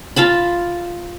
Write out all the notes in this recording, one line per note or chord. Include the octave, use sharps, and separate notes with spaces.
F4 F5 A5 B5